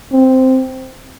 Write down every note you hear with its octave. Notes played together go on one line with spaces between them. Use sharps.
C4